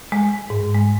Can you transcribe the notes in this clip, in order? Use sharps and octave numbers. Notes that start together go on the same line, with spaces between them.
G#3
G#2
G#3